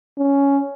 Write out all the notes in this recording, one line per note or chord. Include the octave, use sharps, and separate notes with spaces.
C#4